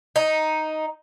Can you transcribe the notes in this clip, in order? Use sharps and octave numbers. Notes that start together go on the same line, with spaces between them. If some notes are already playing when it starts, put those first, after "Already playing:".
D#4